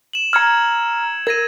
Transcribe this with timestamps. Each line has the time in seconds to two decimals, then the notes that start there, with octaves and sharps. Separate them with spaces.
0.13 E7 F#7
0.33 A#5 E6 F6 G#6 C#7
1.27 A#4 G#6 A#6 D#7